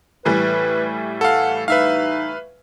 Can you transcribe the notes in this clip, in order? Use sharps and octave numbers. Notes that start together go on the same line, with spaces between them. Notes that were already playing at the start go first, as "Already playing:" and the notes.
A2 E3 G3 B4
A4 F5 F#5
D#4 B4 E5 F5